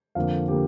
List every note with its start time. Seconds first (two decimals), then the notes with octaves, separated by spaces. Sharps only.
0.15 F2 D3 A#3 F5
0.48 D3 A#3 G4